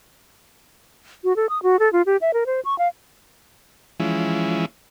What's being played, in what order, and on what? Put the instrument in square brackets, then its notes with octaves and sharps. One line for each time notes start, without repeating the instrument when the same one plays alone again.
[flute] F#4
A4
D#6
F#4
A4
F4
G4
E5
A#4
C5
C#6
F5
[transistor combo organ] E3 F3 G#3 C#4 E4